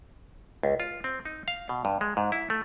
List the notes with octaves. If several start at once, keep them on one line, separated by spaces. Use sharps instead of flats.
C#2
F4
C4
D#4
F5
B2
G2
G#3
G#2
E4
A3